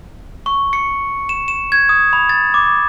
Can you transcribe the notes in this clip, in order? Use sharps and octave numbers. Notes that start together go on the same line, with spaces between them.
C#6
C#7
E7
E7
G#6
D#6
B5
A6
D6